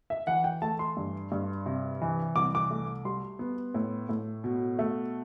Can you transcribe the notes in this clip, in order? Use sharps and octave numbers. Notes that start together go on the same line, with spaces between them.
E5
E3 F#5
G5
A3 A5
C6
G2
G2
C3
E3
C2 D6
D6
A3
G3 C6
B3
A2
A2
B2
A3